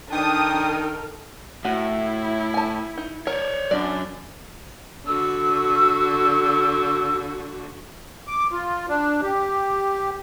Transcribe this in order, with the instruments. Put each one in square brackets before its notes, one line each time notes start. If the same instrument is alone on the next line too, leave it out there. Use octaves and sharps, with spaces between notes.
[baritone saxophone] D#3 [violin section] D4 D#6 [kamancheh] A4 A#4 [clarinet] G5
[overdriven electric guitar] A2 [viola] E4 [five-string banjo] F#4
[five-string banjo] G#5 A5
D#4
[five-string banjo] A#4 [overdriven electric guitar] C#5 D5
[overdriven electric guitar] F#2 [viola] D4 [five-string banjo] D5
[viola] D3 F#4 [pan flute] E6
[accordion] D6
F4
D4
G4